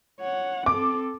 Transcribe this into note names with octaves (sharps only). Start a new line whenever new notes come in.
C#5 F#5
C4 A4 D6